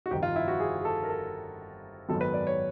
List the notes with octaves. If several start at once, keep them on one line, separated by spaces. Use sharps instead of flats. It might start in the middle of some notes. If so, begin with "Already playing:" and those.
F#4
G1 F2 C3 D#3 G4
F4
E4
F#4
G#4
G#4
A4
A#4
A4
G#1 F#2 D#3 F#3 B3 A4
B4
D5
C#5